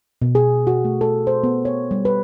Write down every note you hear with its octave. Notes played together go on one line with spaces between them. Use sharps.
B2
G#4
F#4
A3
A4
C5
B3
C#5
G3
B4